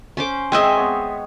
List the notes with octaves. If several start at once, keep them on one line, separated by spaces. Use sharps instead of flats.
C#4 C5 D6
G#3 C4 C5 D#5 E5 G#5
B3 C#5